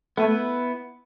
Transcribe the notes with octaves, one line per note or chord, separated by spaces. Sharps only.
A3 B3 E4 B4